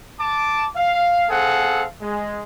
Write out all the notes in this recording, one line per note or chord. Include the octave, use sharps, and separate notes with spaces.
A5 D6
F5
C4 G#4 A4 F5 F#5
G#3